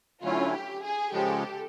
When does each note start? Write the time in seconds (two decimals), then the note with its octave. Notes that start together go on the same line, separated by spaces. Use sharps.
0.23 D3 F#3 A3 C#4 E4 F4
0.53 G4
0.83 G#4
1.12 C#3 F3 G#3 G4 A4